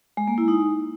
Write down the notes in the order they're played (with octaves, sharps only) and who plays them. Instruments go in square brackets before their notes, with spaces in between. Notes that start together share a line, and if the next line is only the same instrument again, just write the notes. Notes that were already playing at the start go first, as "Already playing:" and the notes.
[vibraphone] G#3
A#3
E4
D#4